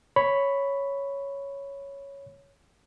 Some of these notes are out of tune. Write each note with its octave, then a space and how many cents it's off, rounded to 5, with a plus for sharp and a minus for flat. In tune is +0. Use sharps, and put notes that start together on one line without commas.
C#5 +0 B5 +0